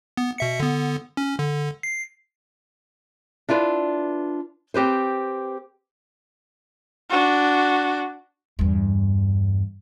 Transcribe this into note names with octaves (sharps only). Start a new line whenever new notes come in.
B3
B2 E5 C#7
D3 B3
C#4
D3
C7
D4 E4 F4 B4 D5
C4 G4 B4 C5
D4 F#4
E2 G2